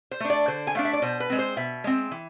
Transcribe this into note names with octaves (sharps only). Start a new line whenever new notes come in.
C5
A3 D4
D5
D3 C5
G#5
A3 D4 F5
E5
D5
B2 C5
B4
G#3 C4
C5
B2 E5
G#3 C4
E3